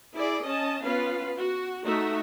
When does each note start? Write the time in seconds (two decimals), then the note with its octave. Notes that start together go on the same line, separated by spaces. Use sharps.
0.14 E4 G#4 D5
0.44 C#4 D#5 A5
0.83 B3 C#4 F4 B4 F5
1.36 F#4
1.84 A3 D#4 F#4 E5 A#5